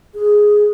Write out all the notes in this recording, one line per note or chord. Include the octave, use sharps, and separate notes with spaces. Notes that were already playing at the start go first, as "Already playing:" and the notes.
G#4